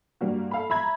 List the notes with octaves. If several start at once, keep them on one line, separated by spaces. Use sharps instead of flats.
G2 G3 A#3 F#4
A4 F5 B5
E5 A#5 B5 G#6